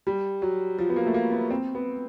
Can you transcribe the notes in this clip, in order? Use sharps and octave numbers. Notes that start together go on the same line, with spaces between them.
G3
F#3
F3
B3
A#3
A3
A#3
B3
C4
B3